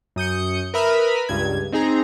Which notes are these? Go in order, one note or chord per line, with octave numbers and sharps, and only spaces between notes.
F#2 D#6 G6 C#7
A#4 B4 E5 B5 D#6 F6
C#2 G2 G#6
C4 D#4 G#4 A#5